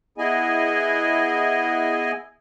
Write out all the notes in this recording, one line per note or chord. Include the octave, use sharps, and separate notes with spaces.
B3 E4 G#4 D#5 G#5